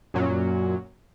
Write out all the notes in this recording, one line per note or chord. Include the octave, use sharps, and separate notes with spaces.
F#2 A#2 F#3